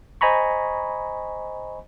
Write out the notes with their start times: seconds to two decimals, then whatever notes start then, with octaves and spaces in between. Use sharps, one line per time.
0.21 C5 D#5 G#5 A#5 B5 C#6